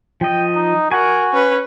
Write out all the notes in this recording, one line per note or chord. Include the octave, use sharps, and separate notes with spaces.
F3 D#5 G5
D#4
F#4 A#4 F#5 G#5
C#4 B4